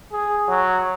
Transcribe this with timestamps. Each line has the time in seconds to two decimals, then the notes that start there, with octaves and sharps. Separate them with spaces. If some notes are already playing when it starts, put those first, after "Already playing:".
0.12 G#4
0.48 F#3